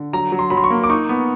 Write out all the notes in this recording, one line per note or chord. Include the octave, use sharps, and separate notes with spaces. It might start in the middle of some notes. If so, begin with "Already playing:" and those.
Already playing: D3
F#3 A#5
F#3
C6
F#3 B5
C6
C#6
A#3
D6
D#4 C#6
B3